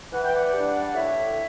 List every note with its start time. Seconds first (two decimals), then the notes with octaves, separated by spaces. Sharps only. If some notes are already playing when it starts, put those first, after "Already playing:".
0.12 E3 F#5
0.24 G5
0.34 D5 F#5
0.54 G3 D4
0.94 A2 C#5 E5